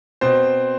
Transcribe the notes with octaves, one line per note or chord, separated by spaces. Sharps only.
B2 C4 C5